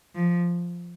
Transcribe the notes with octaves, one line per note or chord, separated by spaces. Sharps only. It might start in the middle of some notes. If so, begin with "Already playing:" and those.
F3